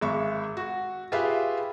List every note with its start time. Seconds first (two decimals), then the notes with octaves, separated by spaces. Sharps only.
0.01 G#1 G#3 E5 B5 C#6
0.57 F#4
1.12 F4 G4 G#4 B4 E5 F5